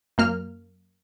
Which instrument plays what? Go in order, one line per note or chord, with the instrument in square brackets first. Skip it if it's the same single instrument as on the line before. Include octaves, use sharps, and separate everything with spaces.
[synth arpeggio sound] F#2 A#3 F6